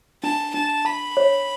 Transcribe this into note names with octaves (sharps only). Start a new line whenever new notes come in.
D4 A5
D4 A5
A5 B5
C#5